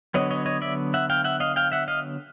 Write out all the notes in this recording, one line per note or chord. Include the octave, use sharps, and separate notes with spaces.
D3 F#3 B3 C#5 D#5
C#5 D#5
C#5 D#5
D5 E5
E5 F#5
F5 G5
E5 F#5
D#5 F5
F5 G5
E5 F#5
D#5 F5